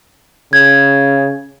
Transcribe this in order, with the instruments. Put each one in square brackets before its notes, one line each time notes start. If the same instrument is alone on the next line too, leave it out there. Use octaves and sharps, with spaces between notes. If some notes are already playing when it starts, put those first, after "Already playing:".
[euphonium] C#3 [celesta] G#6